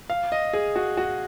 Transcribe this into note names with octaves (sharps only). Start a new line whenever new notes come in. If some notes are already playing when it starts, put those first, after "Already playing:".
F5
D#5
G#4
F#4
F#4